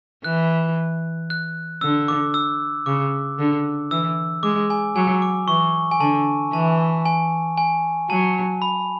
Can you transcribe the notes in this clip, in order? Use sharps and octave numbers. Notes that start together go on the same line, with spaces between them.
E3 F#6
F#6
D3 E6
D6
E6
C#3 D6
D3
E3 E6
G#3 D6
G#5
F#3 G#5
D6
E3 C#6
G#5
D3 A5
E3 A5
G#5
G#5
F#3 A5
B5